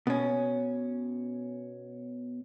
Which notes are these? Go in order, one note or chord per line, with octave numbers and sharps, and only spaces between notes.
B2 C#4